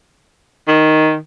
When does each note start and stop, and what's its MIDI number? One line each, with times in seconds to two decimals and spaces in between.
0.68 1.16 51